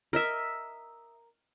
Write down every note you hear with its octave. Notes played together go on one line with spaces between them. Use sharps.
A#4 D#5 E5